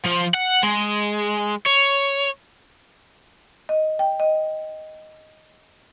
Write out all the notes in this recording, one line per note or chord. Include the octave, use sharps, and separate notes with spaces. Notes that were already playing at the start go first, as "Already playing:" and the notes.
F3
F#5
G#3
C#5
D#5
G5
D#5